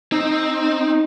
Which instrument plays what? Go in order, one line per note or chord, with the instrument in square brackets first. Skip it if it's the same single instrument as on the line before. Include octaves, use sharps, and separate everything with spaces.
[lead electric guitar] C4 [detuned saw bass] D#4